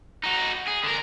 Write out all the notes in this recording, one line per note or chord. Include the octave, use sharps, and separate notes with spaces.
D#4 F#4
G#4
D3 A#4